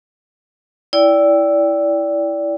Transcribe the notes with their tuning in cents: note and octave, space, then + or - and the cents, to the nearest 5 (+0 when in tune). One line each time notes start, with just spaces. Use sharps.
E4 +0 D5 -20 G5 +0